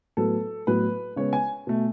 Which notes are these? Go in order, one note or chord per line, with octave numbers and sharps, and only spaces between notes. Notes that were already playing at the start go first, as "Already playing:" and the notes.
A2 F#3 B3 A4
A2 F#3 B3 B4
C#3 G#3 B3 C#5
G#5
B2 A3